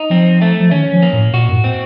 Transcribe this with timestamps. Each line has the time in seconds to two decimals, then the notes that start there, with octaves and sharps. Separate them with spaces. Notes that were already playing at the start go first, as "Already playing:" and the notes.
Already playing: D#4
0.10 F3 C4
0.42 A3
0.60 F3
0.71 D#3 C#4
0.92 F3
1.02 A#3
1.13 A2
1.33 A#2 F#4
1.48 F#2
1.54 A2
1.64 C4